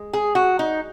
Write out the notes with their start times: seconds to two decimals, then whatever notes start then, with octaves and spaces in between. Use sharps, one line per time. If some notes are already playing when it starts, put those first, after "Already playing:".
Already playing: G#3
0.13 G#4
0.35 F#4
0.59 D#4